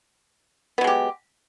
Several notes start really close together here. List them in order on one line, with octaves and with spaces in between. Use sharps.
B3 F#3 G#3 G4